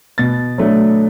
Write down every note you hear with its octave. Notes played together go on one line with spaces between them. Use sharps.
B2 A6
F#3 A3 D4